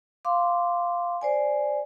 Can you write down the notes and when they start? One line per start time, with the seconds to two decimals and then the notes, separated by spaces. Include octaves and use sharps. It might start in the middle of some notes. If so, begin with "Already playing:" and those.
0.25 F5 C6 D6
1.21 C5 D5 G#5